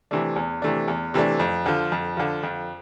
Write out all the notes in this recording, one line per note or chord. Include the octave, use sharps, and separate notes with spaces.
C3 E3 A3 D4
E2
C3 E3 A3 D4
E2
C3 E3 A3 D4
F2
D3 F3
F2
D3 F3
F2